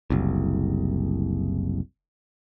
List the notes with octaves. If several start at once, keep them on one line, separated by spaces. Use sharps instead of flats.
F#1 C2